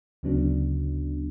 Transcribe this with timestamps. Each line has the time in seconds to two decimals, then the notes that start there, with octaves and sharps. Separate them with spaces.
0.23 D2 C#3 F#3 B3 D4